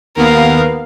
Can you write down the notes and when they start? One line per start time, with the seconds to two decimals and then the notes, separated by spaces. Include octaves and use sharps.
0.16 D#2 B3 A#4 F5